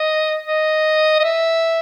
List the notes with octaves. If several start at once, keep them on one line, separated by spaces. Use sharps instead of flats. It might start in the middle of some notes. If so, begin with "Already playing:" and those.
Already playing: D#5
D#5
D#5
E5